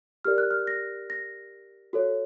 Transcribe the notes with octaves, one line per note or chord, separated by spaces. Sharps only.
G4 A#4 D5 F6
F#6
F6
A#6
A#6
F#4 A4 C#5